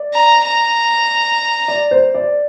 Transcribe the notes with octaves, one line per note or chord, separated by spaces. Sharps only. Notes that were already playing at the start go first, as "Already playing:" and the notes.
Already playing: D5
A#5
A#5
D5
C5
D5